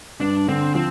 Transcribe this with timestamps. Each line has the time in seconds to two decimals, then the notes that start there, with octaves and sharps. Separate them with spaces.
0.20 G2 D4
0.48 D3 C4
0.75 F3 C4